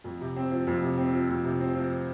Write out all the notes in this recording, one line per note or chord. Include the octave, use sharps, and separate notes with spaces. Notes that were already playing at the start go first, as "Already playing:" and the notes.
F2
C3
C4
F3
F2
C3
C4
F3
F2
C3
C4
F3